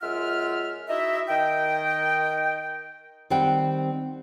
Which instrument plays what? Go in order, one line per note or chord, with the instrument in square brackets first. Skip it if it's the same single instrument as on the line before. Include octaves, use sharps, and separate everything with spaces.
[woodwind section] F#2 G#3 F4 E5 F#5 F6
D#4 E4 F#4 D#5 E5
D#3 D#5 G5
[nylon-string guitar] D#3 G3 C4 F#5 G5